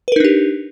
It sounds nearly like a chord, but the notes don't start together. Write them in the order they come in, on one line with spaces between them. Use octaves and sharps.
B4 A#4 D#4 D4 G4